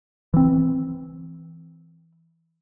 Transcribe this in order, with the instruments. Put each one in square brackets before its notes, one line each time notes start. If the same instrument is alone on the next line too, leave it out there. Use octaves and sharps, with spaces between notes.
[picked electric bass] E3 C4